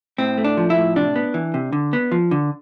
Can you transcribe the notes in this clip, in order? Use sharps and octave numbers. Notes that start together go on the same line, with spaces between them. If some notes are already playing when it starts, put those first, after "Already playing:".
A2 C4
A3
D4
F3
E4
A2
C3 D4
B3
E3
C3
D3
B3
F3
D3